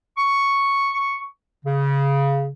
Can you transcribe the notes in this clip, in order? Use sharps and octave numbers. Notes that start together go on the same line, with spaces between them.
C#6
C#3